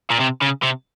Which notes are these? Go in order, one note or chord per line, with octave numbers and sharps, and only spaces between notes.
A#2
C3
C#3
C3